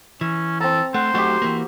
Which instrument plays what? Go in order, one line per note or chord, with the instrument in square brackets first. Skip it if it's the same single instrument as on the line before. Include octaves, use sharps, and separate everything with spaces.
[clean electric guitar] E3 [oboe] C#4
[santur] C4 A#5 [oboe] A4
[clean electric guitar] A3 [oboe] C5 [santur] F#5
[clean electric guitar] F#3 A3 D#4 [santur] F#4 G4
[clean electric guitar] E3 A#3